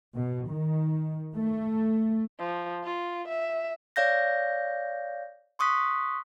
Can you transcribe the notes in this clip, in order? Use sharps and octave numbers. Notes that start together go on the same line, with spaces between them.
B2
D#3
A3
F3
F4
E5
C#5 D5 F5 G6 A#6
C6 C#6 D#6 F#6 B6